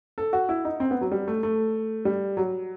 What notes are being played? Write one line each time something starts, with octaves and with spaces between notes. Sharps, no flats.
A4
F#4
E4
D#4
C4
B3
F#3
G3
A3
A3
G3
F#3